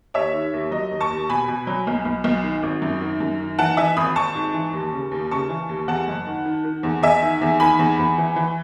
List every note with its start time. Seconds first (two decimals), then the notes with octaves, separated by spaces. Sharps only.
0.14 D#2 C#5 E5
0.33 D#3
0.53 D#2
0.71 F#3 D#5
0.91 D#2
1.00 A5 C#6
1.10 D#2
1.29 B2 G#5 B5
1.48 B2
1.67 F#3
1.87 B1
2.05 B1
2.24 B1
2.44 D#3
2.63 G#1
2.82 F#2
3.01 D#3
3.20 F#2
3.40 D#3
3.59 E3 F#5 A5
3.77 E3 E5 G#5
3.97 G#1 B5 D#6
4.15 G#1 A5 C#6
4.35 G#2
4.54 E3
4.73 D#2
4.92 C#3
5.11 D#2
5.31 C#3 A5 C#6
5.49 E3
5.69 D#2
5.88 E2 F#5 A5
6.08 F#1
6.27 D#3
6.45 D#3
6.64 D#3
6.83 E2
7.02 E2 E5 G#5
7.22 D#3
7.41 E2
7.60 D#3 G#5 B5
7.79 E2
7.99 E2
8.18 E3
8.36 E3